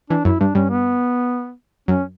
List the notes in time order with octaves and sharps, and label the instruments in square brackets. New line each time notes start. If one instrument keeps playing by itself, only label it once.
[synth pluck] E3 [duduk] D4
[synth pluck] F#2 [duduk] E4
[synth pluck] G2 [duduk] D4
[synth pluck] G2 [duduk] C#4
[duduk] B3
[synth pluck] F#2 [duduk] C#4